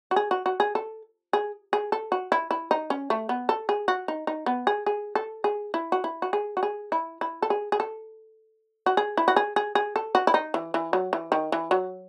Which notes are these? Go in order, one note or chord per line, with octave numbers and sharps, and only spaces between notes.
F#4
G#4
F#4
F#4
G#4
A4
G#4
G#4
A4
F#4
E4
E4
D#4
C#4
A3
B3
A4
G#4
F#4
D#4
D#4
B3
G#4
G#4
A4
G#4
E4
F#4
E4
F#4
G#4
F#4
G#4
E4
E4
A4
G#4
G#4
A4
F#4
G#4
E4
F#4
G#4
G#4
G#4
A4
F#4
E4
D#4
E3
E3
F#3
E3
D#3
E3
F#3